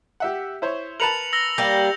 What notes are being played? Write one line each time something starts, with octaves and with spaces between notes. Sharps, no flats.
G4 E5 F#5
E4 C5 C#5
A#4 B4 A5 C#7 F7 F#7
E6 A#6 G7
G3 A#3 G6